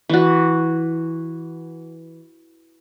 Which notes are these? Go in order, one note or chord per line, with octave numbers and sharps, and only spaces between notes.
E3 F#4